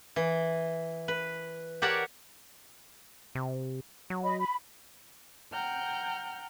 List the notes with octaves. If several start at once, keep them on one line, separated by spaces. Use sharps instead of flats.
E3
B4
G4 A#4 C#5 D5 F#5 A5
C3
F#3
D#5 B5
B5
F#5 G5 A#5 F6 G6